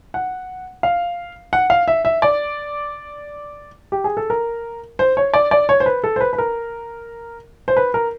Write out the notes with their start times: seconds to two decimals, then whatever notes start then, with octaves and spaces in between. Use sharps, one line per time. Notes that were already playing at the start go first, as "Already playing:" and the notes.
0.14 F#5
0.83 F5
1.53 F#5
1.70 F5
1.88 E5
2.05 E5
2.22 D5
3.92 G4
4.04 G#4
4.17 A4
4.30 A#4
4.99 C5
5.17 C#5
5.34 D5
5.51 D5
5.69 C#5
5.80 C5
5.86 B4
6.04 A4
6.16 C5
6.21 B4
6.33 B4
6.38 A#4
7.68 C5
7.77 B4
7.94 A#4